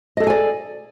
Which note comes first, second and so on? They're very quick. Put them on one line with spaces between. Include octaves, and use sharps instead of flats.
D#5 A4 G#4 G#5 D5